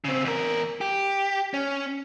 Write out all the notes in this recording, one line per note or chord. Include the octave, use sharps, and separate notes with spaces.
C#3 C4
E2 A#4
G4
C#4